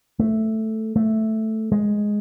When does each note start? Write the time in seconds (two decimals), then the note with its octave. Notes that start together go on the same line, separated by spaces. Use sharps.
0.19 A3
0.96 A3
1.72 G#3